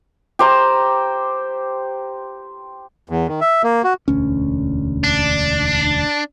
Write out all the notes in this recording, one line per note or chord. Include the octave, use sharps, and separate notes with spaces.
G4 C5 A#5
E2
D#3
E5
A#3
F#4
E1 D2 C#4
D4